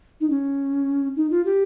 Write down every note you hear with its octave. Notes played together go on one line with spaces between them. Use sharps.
D#4
C#4
D#4
F4
G4